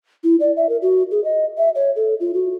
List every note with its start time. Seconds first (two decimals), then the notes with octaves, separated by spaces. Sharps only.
0.24 E4
0.40 D5
0.56 E5
0.69 A#4
0.82 F#4
1.11 G#4
1.24 D#5
1.57 E5
1.75 C#5
1.96 A4
2.20 F4
2.34 F#4